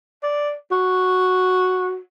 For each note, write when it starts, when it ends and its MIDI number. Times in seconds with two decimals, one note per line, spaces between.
0.23 0.53 74
0.71 1.98 66